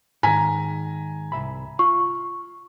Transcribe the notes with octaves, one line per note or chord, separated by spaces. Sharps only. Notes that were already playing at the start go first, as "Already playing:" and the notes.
G#2 D#3 G#5 A#5 B6
C2 E5 B5
F4 C#6